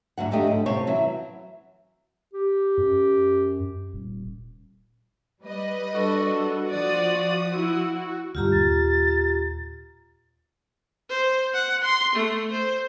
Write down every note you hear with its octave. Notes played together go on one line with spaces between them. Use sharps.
D2 G#2 F#3 F#5
F2 F#3 A3 D4 G4 D#5
G#2 D3
D#2 C3 C5 C#5 A5
E3 F#3 C4 E4
G4
F#2
D#1
G3 B4 D#5
D4 F#4 A4
F3 D5 D#6
E4
D2 G2 F4 G4 A#5
D#1 A6
C5
F#5
C6
A3
C5